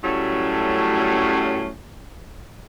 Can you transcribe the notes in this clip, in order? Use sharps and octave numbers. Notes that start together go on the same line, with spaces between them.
F#2 A2 F#3 G3 A3 C#4